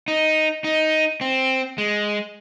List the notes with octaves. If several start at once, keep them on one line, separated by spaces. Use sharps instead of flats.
D#4
D#4
C4
G#3